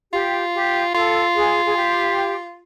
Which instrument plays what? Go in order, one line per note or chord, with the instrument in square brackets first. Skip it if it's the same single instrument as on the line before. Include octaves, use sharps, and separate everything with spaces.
[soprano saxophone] F4 [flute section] G4
[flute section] G4
[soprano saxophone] F4 [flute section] A4
[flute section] G#4
G#4
G4